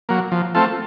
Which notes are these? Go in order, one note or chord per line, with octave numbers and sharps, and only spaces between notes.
F#3 A#3
F3
A3 C4 F4 A4